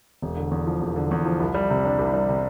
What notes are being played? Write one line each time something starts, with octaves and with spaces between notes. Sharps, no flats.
E1
D3
E2
F3
E1
D3
E2
F3
C2
G3
C3
D4
C2
G3
C3